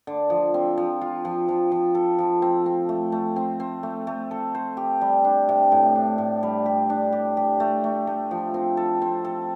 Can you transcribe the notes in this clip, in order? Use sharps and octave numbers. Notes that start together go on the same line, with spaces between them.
D3
F3
C4
F3
F4
F3
F3
F3
A4
F3
C4
C4
A3
A3
C4
C4
A3
A3
A4
C5
G4
G3
D4
C3
A2
D4
A2
G3
G4
D4
G4
G4
A3
A3
A3
F3
C4
A4
C4
A4